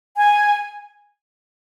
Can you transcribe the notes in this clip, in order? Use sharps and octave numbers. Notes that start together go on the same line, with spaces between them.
G#5